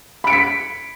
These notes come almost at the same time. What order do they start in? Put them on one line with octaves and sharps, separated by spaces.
B5 D7 C#7 B6